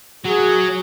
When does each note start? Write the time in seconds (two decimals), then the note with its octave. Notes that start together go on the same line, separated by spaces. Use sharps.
0.25 F#3 G#4